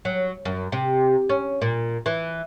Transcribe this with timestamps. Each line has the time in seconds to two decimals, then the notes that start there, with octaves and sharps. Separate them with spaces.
0.05 F#3
0.45 F#2
0.72 C3
1.29 C#4
1.62 A#2
2.06 E3